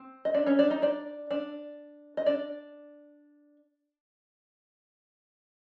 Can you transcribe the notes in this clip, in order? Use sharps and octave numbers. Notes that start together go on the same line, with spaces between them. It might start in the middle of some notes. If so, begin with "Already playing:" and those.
Already playing: C4
D#5
D4 D5
C#4 C#5
D4 D5
D#4 D#5
D4 D5
D4 D5
D#5
D4 D5